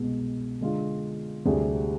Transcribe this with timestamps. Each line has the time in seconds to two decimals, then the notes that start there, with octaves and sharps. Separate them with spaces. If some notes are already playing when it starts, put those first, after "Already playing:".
Already playing: C2 B2 G#3 B3
0.61 D3 G#3 D4 F4
1.45 D2 C3 G3 D4 G#4